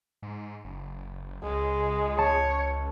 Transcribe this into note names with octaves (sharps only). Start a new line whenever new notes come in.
G#2
F#1
C#2 G#3
C#5 A5